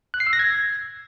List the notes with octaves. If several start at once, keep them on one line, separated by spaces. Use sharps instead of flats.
F#6
C7
E6
A#6
G#6